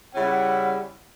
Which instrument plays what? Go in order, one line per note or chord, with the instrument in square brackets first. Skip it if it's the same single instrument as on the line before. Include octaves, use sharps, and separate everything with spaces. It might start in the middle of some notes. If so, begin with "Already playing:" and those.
[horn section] C#3 G3 C#4 E4 [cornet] F#5